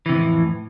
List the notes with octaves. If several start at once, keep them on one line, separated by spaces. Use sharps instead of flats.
F2 A2 C3 E3